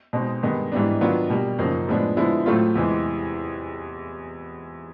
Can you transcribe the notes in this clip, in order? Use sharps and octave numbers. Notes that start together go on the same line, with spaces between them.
B2 G#3 C4 D#4
G2 D#3 G#3 B3
G#2 E3 G3 B3 D4
D#3 F#3 B3 D4 F4
B2 G3 A#3
F#2 C#3 F3 A#3 D#4
A2 F3 G#3 B3 D4
D3 F3 G#3 B3 E4
A2 F#3 A3 C4 F4
E2 C3 E3 G#3